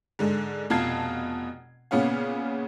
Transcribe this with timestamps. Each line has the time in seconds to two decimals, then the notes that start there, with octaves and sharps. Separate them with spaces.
0.19 G#2 D3 G#3
0.70 F1 B2 F4 A5 G#6 C7
1.91 A#2 C#3 B3 C#4 F5